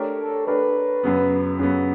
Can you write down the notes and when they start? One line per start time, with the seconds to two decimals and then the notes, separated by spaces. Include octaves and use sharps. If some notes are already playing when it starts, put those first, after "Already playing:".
Already playing: A3 D4 G4 A#4 C#5
0.19 A4
0.47 A3 D4 G4 A#4 B4 C#5
1.03 F#2 C#3 F#3 B3
1.59 F#2 C#3 F#3 B3